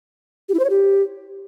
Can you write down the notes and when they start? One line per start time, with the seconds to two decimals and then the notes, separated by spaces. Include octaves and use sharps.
0.49 G4
0.54 E4
0.59 C5
0.65 C#5
0.70 G4